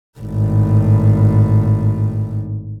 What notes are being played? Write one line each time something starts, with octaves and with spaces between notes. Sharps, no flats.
G#1 A2